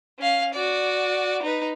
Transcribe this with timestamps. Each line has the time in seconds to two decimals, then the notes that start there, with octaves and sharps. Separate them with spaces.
0.19 C#4 F5
0.54 F#4 D5
1.43 D#4 B4